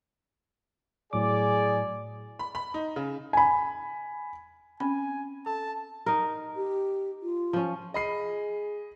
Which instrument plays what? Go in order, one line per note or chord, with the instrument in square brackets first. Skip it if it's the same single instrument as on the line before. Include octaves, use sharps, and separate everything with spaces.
[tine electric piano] A2 F#3 D6 [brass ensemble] G#4 D5 G#5
[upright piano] B5
B5
D#4
C#3
[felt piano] G#5 B5
[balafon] C4 C#4 B5 [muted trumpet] G#5
[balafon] A4 [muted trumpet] A5
[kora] D#4 A#4
[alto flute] G4
F4
[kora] F3 C#4
[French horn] G#4 [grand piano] D#5 B5 C7